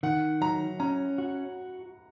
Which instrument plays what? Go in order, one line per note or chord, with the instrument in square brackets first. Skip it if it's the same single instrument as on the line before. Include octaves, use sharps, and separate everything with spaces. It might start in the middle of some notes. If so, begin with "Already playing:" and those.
[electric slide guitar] D#3 [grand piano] F#5
[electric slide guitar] F#3 [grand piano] A#5
[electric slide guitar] C#4 [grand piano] A#5
[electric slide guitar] F#4